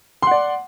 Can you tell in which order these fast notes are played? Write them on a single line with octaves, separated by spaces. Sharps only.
C6 F#5 D5